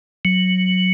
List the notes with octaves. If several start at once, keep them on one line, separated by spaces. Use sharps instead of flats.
F#3